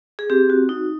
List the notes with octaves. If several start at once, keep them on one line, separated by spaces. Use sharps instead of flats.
G#4
C4 G4
F#4
D#4